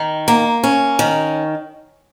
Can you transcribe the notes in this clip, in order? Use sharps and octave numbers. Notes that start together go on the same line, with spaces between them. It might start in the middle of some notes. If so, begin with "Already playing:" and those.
Already playing: D#3
A#3
C#4
D#3